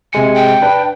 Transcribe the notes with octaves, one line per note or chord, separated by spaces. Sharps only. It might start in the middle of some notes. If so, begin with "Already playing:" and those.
C3 G#3 G#5 C#7
G5
D4 B4